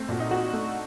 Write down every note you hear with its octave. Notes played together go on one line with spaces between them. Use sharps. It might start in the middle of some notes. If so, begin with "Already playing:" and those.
Already playing: A3 C4
A#2 F#4
D#4
F#4
A3 D4